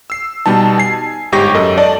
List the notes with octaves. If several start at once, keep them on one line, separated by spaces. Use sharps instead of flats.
E6 C7
B2 G3 D#4 A5
G#5 C7
G1 G#2 G4 C#6 A#6
F#2 A4 D#5
D5 D#5 A5